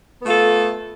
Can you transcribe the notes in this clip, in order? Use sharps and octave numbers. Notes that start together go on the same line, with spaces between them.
A3 B3 F4 A4